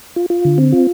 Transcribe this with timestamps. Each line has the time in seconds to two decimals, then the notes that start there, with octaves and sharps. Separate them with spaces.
0.16 F4
0.30 F4
0.45 D3
0.58 C4
0.72 F4